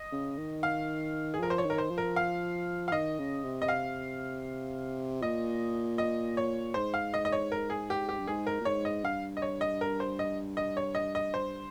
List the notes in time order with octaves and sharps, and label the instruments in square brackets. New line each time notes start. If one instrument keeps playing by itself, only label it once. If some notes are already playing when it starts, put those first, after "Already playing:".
Already playing: [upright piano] D#5
[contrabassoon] C#3
D#3
[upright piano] F5
G#4
[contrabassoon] F3 [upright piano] A#4
[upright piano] C5
C#5
[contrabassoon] D#3 [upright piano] A#4
[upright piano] C5
[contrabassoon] F3
[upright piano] A#4
F5
F5
[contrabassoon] D#3 [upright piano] D#5
[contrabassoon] C#3
C3
[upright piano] D#5
F5
[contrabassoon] A#2 [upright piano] D#5
[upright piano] D#5
C#5
[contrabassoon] G#2 [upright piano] C5
[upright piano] F5
D#5
D#5
C#5
A#4
G#4
G4
G4
[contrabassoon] G2
[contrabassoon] G#2 [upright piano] G#4
[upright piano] A#4
[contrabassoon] A#2
[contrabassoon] G#2 [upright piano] C#5
[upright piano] D#5
[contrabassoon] G2 [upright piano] F5
[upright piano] D#5
C#5
D#5
A#4
C5
D#5
D#5
C#5
D#5
D#5
C5